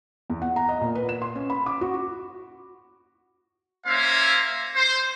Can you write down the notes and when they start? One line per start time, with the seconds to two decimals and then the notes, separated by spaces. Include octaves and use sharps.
0.30 E2
0.42 F#5
0.56 A#5
0.69 D#5
0.81 A#2
0.95 B4
1.09 E7
1.22 C6
1.36 C#4
1.50 B5
1.66 D6
1.81 F#4
3.87 A#3 C#4 C5 E5 F5
4.75 C5